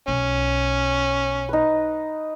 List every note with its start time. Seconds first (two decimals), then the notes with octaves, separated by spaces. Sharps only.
0.08 B1 C#4
1.49 D#4 B4